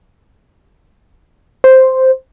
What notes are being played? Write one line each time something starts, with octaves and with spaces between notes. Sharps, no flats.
C5